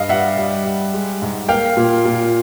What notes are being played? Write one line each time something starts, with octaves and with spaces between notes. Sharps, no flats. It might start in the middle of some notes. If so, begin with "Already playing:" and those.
Already playing: G2 D#5 F5
G3 E5 F#5
G3
G3
G#3
G#2
A#3 F5 G5
A#2
A#2